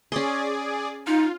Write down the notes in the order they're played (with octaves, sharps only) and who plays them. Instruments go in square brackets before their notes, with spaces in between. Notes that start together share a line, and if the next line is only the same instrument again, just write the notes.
[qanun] C#4 C6 [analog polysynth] G#4 D5
[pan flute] D#4 [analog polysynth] F4